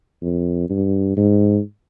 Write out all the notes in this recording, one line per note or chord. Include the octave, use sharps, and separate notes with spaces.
F2
G2
G#2